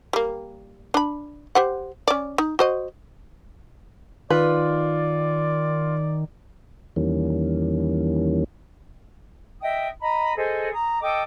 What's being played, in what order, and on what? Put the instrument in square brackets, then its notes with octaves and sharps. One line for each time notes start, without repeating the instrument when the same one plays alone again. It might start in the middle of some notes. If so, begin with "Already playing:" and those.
[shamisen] G3 A#3
D4 B5
G4 C5 F#5
C#4 D5
D#4
F#4 C5 D#5
[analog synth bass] D#3 [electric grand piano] F4 [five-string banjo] B4 [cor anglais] D5
[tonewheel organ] E2 D#3 E3 G3 A#3 C#4
[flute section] D#5 E5 G5 D#6
D#5 A#5 B5
G#4 A4 C5 D#5
A#5 D#6
A4 D#5 G5 D6